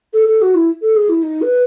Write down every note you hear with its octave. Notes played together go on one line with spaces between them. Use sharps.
A4
A4
F#4
E4
A4
G#4
E4
D#4
B4